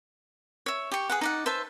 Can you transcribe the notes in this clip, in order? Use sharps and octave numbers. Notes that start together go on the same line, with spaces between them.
C#5 E5
G4 C#6
G#4 B4 F#5
D#4 D5 F#5
B4 C5 E5 A5